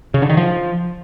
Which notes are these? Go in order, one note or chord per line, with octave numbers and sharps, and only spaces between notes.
C#3
D3
D#3
F3